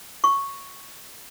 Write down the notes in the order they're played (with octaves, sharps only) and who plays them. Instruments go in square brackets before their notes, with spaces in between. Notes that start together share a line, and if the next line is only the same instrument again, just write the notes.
[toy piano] C#6